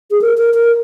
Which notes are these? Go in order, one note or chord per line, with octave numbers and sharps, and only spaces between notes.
G#4
A#4
A#4
A#4